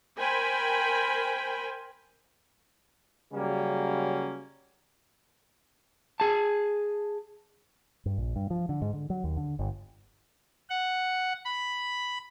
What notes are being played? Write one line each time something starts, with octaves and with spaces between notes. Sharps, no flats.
A#4 C5 G5 G#5 B5
C#3 F#3 G3 A#3 C#4
G#4 A5
G2
A#1
G2
F3
D3
G#2
D3
F#3
D#2
D3
G1
F#5
B5